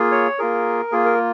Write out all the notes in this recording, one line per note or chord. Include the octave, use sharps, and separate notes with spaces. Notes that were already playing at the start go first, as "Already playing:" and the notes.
Already playing: A#3 F4 G#4
C#5
A#3 F4 G#4 A#4
A#3 F4 G#4
A#4